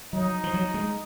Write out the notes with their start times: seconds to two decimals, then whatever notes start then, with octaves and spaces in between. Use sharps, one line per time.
0.13 F#3 D#4
0.44 F3
0.54 F#3
0.74 G#3